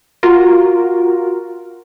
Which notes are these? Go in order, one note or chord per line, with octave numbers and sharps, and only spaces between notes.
F4 F#4 A#4